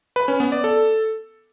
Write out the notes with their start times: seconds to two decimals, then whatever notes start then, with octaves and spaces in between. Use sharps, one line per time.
0.16 B4
0.28 C#4
0.40 B3
0.52 D5
0.64 A4